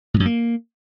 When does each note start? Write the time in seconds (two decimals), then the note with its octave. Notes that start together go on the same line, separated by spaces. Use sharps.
0.14 A2
0.20 F#2
0.26 A#3